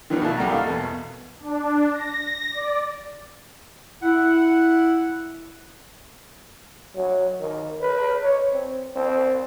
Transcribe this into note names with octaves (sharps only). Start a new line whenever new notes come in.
D#3 E3 F#3 G3 B3
B1 F#3 A3 A#3 E4 A5
C2 G3 F#5 A#5
A3 A#3 F4 A4 D#5 F5
E2 B2
D4
A#6
D5
E4 F#5
F#3
D#3
B4
C#5
C4
C4